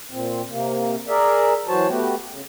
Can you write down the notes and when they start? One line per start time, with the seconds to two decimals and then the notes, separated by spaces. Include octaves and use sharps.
0.11 A#2 C4
0.50 C3 A#3
1.08 G#4 A#4 D5 E5
1.68 E3 F#3 F#4 C5 C#5 A5
1.88 A3 B3 F#4 G4
2.30 C#3